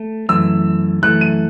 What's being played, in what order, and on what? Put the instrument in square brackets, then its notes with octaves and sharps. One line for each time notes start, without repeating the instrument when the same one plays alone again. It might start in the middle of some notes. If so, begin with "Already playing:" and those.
Already playing: [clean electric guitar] A3
[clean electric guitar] F#2 E3 A3 [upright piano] E6
[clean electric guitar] F#2 E3 A3 [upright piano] F#6
[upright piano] D#7